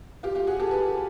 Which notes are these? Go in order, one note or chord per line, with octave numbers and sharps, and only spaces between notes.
F4 G4
F4 G4
F#4 G#4
G4 A4
A4 B4